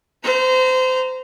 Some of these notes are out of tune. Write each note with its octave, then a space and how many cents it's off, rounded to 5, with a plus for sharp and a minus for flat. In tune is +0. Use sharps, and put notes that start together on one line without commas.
C5 -25 A#5 +0